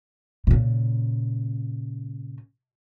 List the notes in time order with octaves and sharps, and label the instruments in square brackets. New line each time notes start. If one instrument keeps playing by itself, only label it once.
[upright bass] A#2 C#3